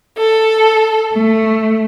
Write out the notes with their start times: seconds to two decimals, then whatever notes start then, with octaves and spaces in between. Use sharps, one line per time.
0.17 A4
1.13 A3